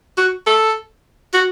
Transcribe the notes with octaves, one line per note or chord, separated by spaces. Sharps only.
F#4
A4
F#4